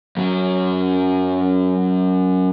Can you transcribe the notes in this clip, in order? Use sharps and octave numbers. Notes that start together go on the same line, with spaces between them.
F#2 F#3